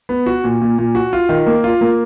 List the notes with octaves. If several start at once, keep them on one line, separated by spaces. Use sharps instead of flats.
B3
F#4
A#2
A#2
A#2
F#4
F4
D#3
A#3
F4
A#3